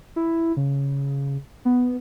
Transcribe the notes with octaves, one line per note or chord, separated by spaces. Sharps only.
E4
C#3
B3